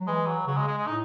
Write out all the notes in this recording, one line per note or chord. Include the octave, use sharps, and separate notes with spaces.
F#3
E3 G#3
F#3
C#3 F#3
G#3
G#3
G#3
A2 D#4